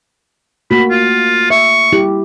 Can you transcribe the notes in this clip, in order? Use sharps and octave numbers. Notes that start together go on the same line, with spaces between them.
A3 A#3 F#4 B5
F4
E5 C#6
G3 E4 G4